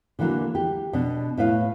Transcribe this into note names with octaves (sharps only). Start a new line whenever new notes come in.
D3 E3 F#3 A3 A#3 D4
G4
B2 B3 D4
A2 E4 B4 F5